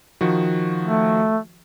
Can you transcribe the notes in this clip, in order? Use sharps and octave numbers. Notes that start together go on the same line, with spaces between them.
D#3 F3 F#4
A3